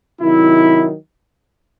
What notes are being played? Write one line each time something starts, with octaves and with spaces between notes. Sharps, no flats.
C3 D#3 F#3 E4